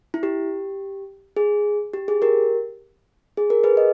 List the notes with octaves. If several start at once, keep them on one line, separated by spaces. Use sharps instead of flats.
E4
G4
G#4
G4
G#4
G4 A#4
G#4
A#4
G#4 B4
D#5